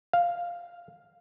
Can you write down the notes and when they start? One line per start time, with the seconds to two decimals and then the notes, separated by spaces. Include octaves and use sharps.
0.13 F5